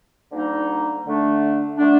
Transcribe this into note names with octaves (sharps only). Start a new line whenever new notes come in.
D2 D3 G3 A#3 D#4
D3 A3 D4
D3 A3 D4